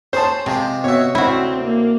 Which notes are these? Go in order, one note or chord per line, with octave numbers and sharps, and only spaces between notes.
C#4 G#4 C5 A5
C3 F3 G#3 G4
B2 F#4 C#5 E5
D2 C4 E4 F#4
A#3